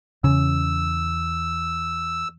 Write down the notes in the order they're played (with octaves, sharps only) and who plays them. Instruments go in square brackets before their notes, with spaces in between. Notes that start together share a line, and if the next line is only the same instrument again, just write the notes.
[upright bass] E2 [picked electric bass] C#3 [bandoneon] E6